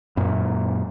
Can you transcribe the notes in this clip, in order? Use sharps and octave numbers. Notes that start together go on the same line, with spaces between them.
F#2 A#2